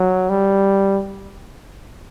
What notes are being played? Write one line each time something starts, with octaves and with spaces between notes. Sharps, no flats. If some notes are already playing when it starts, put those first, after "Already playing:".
Already playing: F#3
G3